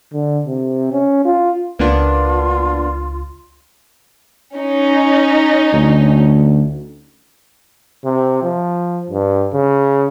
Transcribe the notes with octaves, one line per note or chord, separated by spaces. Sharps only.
D3
C3
C#4
F4
C#2 A#3 B3 D4 F4
C#4 D#4
D2
C3
F3
G2
C#3